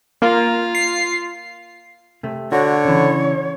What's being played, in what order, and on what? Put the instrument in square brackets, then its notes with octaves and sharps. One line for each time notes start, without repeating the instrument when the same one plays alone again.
[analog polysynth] A#3 [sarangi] F4
[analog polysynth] C7
[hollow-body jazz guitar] C3 A3
[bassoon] D3 [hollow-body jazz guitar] F#4 [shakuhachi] C#5
[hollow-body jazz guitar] C#3 E3